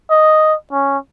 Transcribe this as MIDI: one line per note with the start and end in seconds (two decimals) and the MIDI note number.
0.11 0.55 75
0.72 0.98 61